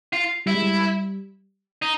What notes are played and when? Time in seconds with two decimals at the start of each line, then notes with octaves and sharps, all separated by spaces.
0.13 F4
0.46 G3 E4
0.54 G#3
0.62 G3
1.82 D#4